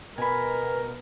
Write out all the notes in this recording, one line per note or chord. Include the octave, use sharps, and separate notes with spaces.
B2 A#4 B4 G#5 B5